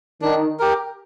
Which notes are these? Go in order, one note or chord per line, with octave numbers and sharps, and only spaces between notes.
D#3 D4
G4 A#4